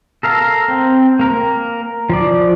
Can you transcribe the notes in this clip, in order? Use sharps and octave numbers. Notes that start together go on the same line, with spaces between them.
A4 A#4 F5
C4
A#3 A#4
F3 D5